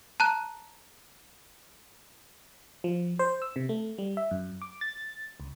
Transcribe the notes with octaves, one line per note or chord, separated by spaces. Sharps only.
A5 A#5 F#6
F3
C5
E6
C3
A3
G3
E5
F#2
D6
A6
C#2